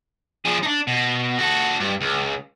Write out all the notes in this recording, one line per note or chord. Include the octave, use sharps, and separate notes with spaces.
F3 G#4
D4 D#4
B2
F#4 A4
G2
C#2